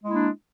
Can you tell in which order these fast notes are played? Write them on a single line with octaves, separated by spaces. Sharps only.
G#3 E4 A#3 D4